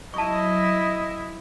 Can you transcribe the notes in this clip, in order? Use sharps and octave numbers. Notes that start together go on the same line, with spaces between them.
F#3 E4 D#5 A5 C#6